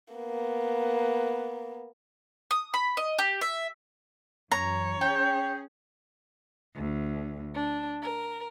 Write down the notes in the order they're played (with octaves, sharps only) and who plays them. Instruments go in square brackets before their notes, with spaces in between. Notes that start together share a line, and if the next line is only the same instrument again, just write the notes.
[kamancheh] A#3 B3
[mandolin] D#6
B5
D#5
G4
E5
[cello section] F#2 E3 [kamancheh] C#5 [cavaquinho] A#5
[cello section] C#4 G#4 [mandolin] G5
[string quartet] D2
D4
A#4